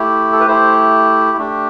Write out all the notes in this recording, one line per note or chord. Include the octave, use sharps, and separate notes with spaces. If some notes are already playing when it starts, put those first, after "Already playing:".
Already playing: A3 E4 G4
A4
B4
A3 E4 G4 C5
A3 D4 G4